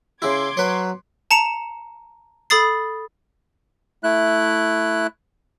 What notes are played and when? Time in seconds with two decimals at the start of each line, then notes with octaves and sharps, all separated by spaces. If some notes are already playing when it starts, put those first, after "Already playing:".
0.22 C#3 E4 C6 D6 G#6
0.57 F#3 B4 C#5
1.31 A5 A#5 C#7 E7
2.50 A4 B5 D#6 A6 C7
4.03 A3 E4 F#6